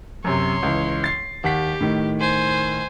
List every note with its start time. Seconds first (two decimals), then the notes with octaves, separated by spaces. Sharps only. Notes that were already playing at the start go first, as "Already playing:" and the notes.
0.24 F#2 C3 C#5 C6
0.63 C#2 E3
1.04 A6 C7
1.44 D#2 G4 F#5 B6
1.80 A2 D#3
2.20 C5 G#5